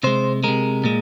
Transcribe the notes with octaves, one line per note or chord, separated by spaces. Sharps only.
C3 G#3 C5
C3 G#3 A#4
A#2 G#3